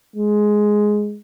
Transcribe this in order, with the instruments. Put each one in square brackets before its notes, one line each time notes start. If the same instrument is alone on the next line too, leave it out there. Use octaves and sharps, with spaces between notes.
[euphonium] G#3